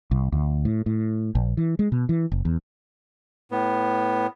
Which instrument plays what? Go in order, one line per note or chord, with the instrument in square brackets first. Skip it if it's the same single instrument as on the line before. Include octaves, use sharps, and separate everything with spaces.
[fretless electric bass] C2
D2
A2
A2
A#1
E3
G#3
B2
E3
F#1
E2
[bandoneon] A2 B3